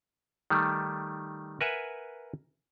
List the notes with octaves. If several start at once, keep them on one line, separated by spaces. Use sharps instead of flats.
D#3 G3 A3
A#4 B4 E5 F#5 G#5